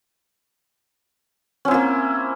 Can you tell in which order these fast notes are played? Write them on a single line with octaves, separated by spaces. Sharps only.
C#4 C4 E4 A#3